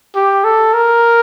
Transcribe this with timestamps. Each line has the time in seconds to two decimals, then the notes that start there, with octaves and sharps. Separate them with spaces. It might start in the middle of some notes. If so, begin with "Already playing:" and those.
0.15 G4
0.44 A4
0.73 A#4